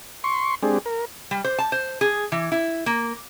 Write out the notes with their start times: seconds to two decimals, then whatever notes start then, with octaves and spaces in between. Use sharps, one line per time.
0.24 C6 C#6
0.63 G#3 C4 D4 G4 G#4
0.86 A#4
1.31 G3
1.44 C5
1.59 A5
1.72 C5
2.01 G#4
2.32 E3
2.52 E4
2.86 A#3